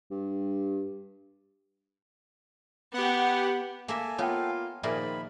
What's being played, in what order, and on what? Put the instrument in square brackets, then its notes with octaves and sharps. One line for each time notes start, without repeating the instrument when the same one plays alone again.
[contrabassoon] G2
[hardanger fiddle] B3 [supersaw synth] G4 F#5
[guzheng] A#3 A#4 E5 [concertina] A4 G#5
[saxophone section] A#3 F4 [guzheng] B3 [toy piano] C#5 F5 G5
[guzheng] A#2 G#4 A#4 [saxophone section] D#3 F3 [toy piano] E5 [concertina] B5